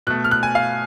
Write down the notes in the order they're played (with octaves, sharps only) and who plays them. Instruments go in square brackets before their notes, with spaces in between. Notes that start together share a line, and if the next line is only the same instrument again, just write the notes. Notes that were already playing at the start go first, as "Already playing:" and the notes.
[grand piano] B2 F#6
A3
F6
F#6
G#5
F5